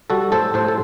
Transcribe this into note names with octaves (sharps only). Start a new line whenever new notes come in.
G3 F#4 A4
A2 A4 C5
A2 A4 C5
A4